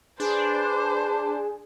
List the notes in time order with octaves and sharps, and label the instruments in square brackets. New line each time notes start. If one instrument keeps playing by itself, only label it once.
[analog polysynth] D4 [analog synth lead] G#4 [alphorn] B4 [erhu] C5